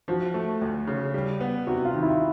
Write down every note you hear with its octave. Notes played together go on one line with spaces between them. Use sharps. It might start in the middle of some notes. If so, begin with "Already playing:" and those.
F3 F#4
A3
D2
C#3
G3
B3
C3 F#4
F4
D#3
E4